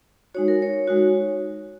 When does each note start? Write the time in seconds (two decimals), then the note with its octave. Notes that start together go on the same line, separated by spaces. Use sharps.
0.34 G#3 D#4 F#4 C#5
0.48 A#4
0.62 C#5
0.88 G#3 D#4 F#4